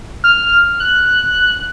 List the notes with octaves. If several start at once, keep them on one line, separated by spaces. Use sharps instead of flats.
F6
F#6